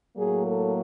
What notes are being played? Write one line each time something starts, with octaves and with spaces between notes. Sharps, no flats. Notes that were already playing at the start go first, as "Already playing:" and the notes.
A2 F#3 A#3 G#4
A4